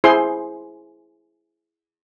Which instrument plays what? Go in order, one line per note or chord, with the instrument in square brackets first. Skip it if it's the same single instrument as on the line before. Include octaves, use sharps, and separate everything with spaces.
[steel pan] E4 G#4 C5 C6